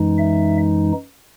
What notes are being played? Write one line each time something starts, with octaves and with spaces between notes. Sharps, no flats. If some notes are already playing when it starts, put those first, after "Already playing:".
Already playing: F#2 E3 G#3 D#4
E5